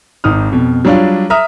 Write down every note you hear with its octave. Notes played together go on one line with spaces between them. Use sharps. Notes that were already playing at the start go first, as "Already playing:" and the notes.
G#1 D#4 D#6 F6
F2 B2
F#3 G3 D4 F4
E5 A#5 D#6 F6